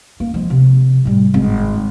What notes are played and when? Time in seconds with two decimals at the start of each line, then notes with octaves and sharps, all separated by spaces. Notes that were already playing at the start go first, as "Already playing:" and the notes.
0.20 A#3
0.34 F3 G#3
0.50 C3
1.05 A2 G3
1.34 G#1